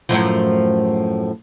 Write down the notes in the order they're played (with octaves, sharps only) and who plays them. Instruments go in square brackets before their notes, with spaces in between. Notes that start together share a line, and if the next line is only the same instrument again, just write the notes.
[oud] F#2 A2 F3